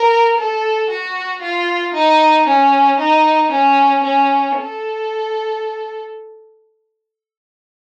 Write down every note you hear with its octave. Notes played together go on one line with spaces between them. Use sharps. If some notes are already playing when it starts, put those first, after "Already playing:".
Already playing: A#4
A4
F#4
F4
D#4
C#4
D#4
C#4
C#4
A4